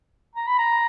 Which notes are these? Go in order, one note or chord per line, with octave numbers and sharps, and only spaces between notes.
A#5
B5
A#5